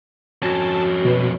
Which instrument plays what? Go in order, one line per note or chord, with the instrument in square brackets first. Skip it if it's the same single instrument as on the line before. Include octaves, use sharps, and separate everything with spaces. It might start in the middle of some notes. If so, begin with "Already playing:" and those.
[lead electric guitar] F2 C#4 [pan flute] F#4 [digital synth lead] A5
[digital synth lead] B2